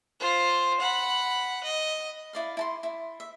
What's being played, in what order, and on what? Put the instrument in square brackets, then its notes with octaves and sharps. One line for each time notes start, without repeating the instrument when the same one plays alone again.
[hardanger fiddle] F4 C5
F#5 B5
D#5
[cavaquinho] E4 D5 F5
E4 A5 C6
E4
E5